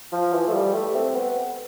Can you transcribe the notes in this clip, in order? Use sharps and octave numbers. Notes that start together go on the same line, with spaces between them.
F3
E3
A3
G3
A3
C4
B3